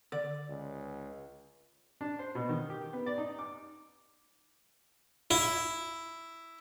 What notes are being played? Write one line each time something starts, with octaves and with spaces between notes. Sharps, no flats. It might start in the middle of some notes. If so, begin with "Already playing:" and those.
D3 D5
C#2
D4
C5
B2
D#3
G4
B3
D5
D#4
D6
E4